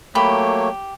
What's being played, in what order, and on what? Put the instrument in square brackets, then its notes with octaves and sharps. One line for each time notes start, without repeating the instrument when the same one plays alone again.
[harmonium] F#3 C#5 [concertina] A3 A#3 [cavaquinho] G4 [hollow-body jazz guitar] B5